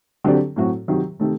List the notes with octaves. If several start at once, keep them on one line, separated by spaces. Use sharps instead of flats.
D3 F#3 C4 G4 D5
A2 F#3 C4 F#4
C3 D#3 F#3
C3 D#3 A3